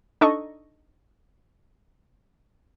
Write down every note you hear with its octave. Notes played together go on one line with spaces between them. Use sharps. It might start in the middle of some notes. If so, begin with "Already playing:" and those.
D4 D#4 A4 D#5 C#6